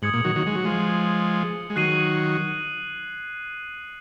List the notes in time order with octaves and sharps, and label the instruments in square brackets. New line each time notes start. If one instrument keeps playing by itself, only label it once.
[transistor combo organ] G#2 [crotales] D#6 G#6 C#7 F#7
[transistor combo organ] A#2
D#3 F#3
D#3 F#3
G#3
F#3
F3 G#3
G#3
[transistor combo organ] D#3 F#3 [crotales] F#6 C7 D#7 F#7